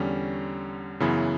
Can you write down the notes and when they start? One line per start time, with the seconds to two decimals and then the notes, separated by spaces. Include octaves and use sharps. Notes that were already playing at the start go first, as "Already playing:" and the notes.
Already playing: E2 D3 G3 C#4
1.00 F#2 C#3 E3 B3 E4